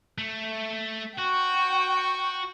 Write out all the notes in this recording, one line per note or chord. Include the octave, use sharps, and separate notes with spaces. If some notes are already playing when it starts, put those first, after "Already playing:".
A3
F#4 G5 C#6